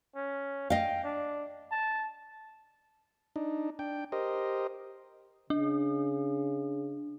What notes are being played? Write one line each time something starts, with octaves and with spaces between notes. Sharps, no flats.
C#4
D#5 F5 G5
D4
A5
D4 D#4
D4 G5
G4 A#4 C5 D#5
C#3 D4